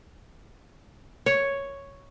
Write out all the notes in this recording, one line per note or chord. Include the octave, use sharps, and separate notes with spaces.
C#5